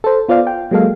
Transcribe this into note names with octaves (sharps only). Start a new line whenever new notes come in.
A4 C5
B3 F4 C5 D5 F5
G5
F#3 G#3 A#3 A4 F5